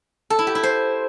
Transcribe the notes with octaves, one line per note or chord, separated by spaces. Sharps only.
A4
E4
G4
E4
C5